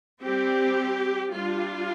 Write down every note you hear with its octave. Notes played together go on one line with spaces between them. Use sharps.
G3 C4 G4
G3 D4 F4